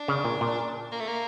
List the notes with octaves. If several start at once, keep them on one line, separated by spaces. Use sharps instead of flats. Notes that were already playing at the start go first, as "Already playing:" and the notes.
Already playing: D4
C#3
A#2
A#2
A#3
A3
A#3